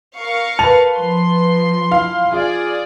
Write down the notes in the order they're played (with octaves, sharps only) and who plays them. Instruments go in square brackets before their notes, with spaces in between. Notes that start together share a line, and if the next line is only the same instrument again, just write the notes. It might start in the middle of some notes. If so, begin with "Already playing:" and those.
[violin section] A#4 F5 C#6
[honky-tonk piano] B4 F7 [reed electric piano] A5
[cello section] F3 [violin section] C6
[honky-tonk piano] E4 F5
[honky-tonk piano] F4 [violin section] G#4 D5